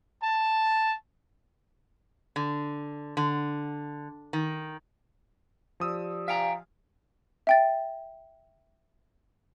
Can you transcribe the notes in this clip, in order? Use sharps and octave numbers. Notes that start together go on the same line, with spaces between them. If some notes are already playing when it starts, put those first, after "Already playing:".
A5
D3
D3
D#3
F3 G4 D5 D#6 E6
E5 F5 G5 G#5 A#5
E5 G5 A6